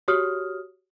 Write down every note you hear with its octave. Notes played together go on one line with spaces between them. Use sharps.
F#4 G4 C#5 D#6 F6